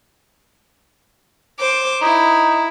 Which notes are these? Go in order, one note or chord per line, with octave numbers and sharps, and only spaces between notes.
C5 D6
D#4 E4